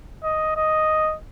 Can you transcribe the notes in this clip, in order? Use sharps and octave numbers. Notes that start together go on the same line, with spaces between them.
D#5
D#5